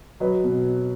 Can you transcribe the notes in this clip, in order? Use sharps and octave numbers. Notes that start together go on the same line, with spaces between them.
F#3 B4 D#5
B2